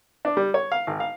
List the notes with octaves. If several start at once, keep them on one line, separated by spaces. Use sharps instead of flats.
D4
G3
C#5
F5
G#1
F5